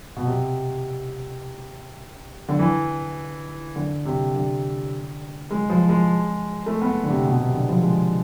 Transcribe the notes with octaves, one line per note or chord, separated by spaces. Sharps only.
B2
C3
D3
E3
D3
C3
D3
G#3
F3
G#3
A3
B3
D3
C3
B2
C3
D3
F3
G#3